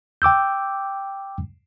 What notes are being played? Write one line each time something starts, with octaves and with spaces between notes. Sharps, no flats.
G5 D6 E6 G6